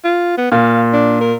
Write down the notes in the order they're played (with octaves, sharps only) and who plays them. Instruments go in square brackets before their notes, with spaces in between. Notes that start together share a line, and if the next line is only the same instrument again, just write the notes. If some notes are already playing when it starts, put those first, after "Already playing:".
[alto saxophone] F4
B3
[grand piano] A#2 [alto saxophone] F5
[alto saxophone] D4
A#4